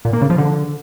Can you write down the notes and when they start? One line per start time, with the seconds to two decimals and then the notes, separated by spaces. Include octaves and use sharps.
0.05 A#2
0.13 A#3
0.21 C#3
0.30 F3
0.38 D3